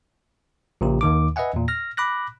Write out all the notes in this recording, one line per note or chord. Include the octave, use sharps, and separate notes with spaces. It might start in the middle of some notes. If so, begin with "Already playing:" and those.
A#1 A#2 C#3 G4
D#2 D#3 D6
B4 D#5 E5 F#5 G#5
E2 A#2
F6 A#6
B5 D6 F#6 A#6